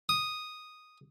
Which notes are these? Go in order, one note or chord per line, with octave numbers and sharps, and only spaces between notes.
D#6